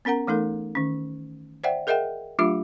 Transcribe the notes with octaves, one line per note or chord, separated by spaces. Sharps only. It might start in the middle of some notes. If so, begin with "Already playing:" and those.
B3 C#4 A#4 F#5 A#5
E3 A3 D#4 A4 A#4
D#3 C#4
C5 D5 E5 F#5 G5
G#4 A#4 D#5 E5 F#5 G5
F#3 A3 D4 F4 G4 E5